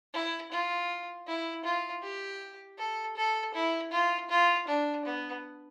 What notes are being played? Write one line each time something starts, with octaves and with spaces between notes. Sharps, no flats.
E4
F4
E4
F4
G4
A4
A4
E4
F4
F4
D4
B3